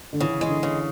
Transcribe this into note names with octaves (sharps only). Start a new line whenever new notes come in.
D3
C#3 E3
E3 G#3
D3
C#3